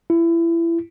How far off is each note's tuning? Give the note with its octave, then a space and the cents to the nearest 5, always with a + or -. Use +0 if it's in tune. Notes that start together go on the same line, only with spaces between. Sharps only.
E4 +25